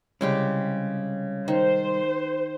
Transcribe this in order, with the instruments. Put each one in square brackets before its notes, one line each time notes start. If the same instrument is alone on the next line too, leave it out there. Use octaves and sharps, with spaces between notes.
[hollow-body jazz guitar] C2 [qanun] C#3 G#3 G4
[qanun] D#3 [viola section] C5